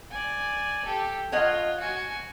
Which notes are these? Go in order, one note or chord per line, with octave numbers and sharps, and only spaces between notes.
D5 G#5
G4 A4
F4 C#5 D#5 F#5
F#4 G#5